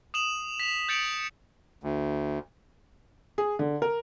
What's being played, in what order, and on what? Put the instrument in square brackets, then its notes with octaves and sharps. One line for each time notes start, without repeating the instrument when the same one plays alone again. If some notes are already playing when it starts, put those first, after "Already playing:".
[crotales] D#6 E7 F#7
B6 F7
G6 A6 C#7 D7 F#7
[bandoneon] D2
[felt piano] G#4
D3
A#4